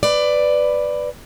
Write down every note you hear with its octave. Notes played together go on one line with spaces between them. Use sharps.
B4 D5